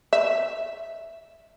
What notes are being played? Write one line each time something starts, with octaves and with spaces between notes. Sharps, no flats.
E5